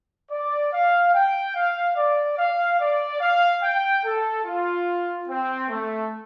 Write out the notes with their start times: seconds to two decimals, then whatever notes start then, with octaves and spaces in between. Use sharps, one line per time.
0.31 D5
0.73 F5
1.14 G5
1.56 F5
1.97 D5
2.38 F5
2.79 D5
3.21 F5
3.63 G5
4.04 A4
4.45 F4
5.28 C4
5.69 A3